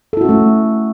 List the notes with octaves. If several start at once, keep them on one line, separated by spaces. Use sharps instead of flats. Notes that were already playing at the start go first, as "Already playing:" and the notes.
A3 C#4 E4 F#4 A4